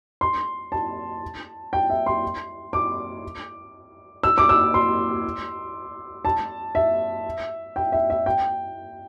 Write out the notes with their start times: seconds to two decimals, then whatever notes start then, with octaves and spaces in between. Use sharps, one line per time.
0.21 C6
0.72 A5
1.73 G5
1.90 E5
2.06 C6
2.73 D6
4.23 E6
4.38 D6
4.49 E6
4.74 C6
6.25 A5
6.75 E5
7.76 G5
7.92 E5
8.10 E5
8.26 G5